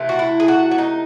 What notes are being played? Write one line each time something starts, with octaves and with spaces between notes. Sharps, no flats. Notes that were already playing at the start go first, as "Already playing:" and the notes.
Already playing: C3 E3 A3
F#4
E4
G#4
F#4
C#4
D#4